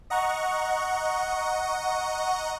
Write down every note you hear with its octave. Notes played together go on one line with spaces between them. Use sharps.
D#5 F#5 A#5 C#6